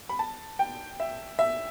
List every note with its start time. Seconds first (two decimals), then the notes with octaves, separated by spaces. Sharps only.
0.09 B5
0.19 A5
0.59 G5
1.00 E5
1.39 E5